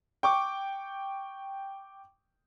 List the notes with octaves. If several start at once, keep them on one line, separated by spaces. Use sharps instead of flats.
G5 C#6 D6